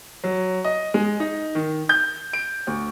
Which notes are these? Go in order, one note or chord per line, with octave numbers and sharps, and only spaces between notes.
F#3
D#5
G#3
D#4
D#3
G6
D7
D2